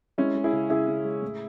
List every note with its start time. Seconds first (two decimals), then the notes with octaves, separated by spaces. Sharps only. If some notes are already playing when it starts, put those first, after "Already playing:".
0.18 G#3 C#4 E4
0.35 G#3
0.44 E4 G#4
0.53 C#3
0.70 C#3 E4 G#4
0.87 C#3
1.05 G#3
1.22 A2